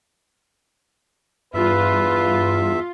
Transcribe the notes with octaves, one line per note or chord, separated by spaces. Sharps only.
E2 G2 F4 B4 E5